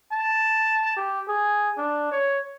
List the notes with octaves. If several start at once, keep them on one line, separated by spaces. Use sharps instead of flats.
A5
G4
G#4
D4
C#5